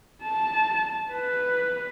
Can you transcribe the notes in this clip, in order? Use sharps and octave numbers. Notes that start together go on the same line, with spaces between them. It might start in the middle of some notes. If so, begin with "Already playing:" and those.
A5
B4